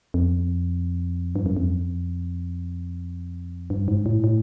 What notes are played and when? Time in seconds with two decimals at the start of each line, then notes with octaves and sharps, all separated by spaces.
0.14 F2
1.36 G2
1.46 F#2
1.57 F2
3.70 G2
3.88 G#2
4.06 A2
4.24 A2